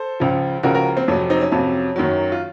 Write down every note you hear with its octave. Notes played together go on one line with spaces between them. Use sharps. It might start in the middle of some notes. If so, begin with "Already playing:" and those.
Already playing: A4 C5
C#2 C#3 F3
C#2 C#3 F3 F#4 A#4
F#4 A#4
C4
F2 C3 F#3 C#4
C4 D#4
C#4
F2 C3 F#3 C#4
F#2 D#3 F#3
F4